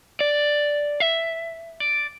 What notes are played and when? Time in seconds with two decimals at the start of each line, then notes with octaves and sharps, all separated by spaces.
0.21 D5
1.00 E5
1.80 D5